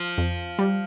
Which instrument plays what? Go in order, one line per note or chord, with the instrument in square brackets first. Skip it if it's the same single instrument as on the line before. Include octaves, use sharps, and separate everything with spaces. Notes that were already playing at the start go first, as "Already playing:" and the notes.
Already playing: [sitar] F3
[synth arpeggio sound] F2
G3